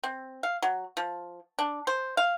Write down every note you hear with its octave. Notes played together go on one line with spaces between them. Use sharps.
C4
F5
F#3
F3
D4
C5
F5